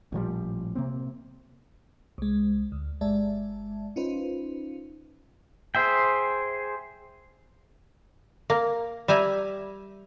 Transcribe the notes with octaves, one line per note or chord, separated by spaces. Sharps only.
A1 A#2 F3 G3
C3 A#3 C4
C2 G#3
D2
G1 G#3 D5 E5 A5
C#4 D#4 F4 B4 C5
G#4 C5 E5 G5
A#3
G3 E5 G#5 A#5